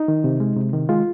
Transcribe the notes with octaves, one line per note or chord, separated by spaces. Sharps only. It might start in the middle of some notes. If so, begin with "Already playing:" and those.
Already playing: D#4
D#3
C3
G#3
C3
D#3
G#3 F4